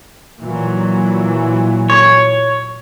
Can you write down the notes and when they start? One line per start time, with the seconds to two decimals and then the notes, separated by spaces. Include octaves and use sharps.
0.41 A#2 E3 F#3
1.90 C#5